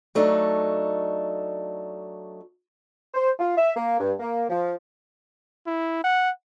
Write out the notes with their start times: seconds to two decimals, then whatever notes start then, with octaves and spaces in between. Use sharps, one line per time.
0.15 F#3 A3 D4 D#4
3.14 C5
3.39 F4
3.58 E5
3.76 A#3
4.00 G2
4.20 A#3
4.50 F3
5.67 E4
6.04 F#5